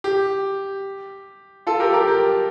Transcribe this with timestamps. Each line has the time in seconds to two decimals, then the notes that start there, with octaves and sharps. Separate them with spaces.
0.04 G4
1.67 F4 A4
1.80 G4 A#4
1.93 G4 A#4
2.08 G4